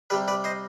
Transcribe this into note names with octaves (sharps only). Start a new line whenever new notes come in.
C3 G3 G4 B4
B4 D5
C5 D#5